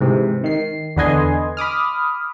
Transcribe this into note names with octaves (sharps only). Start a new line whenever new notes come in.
G#2 C3 E3
D#3 C7
E2 D3 B4 D#5 G#5 C6
B5 D6 D#6 F6